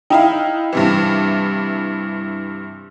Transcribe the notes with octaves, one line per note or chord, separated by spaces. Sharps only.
D#4 E4 F5 G5
G2 C3 E3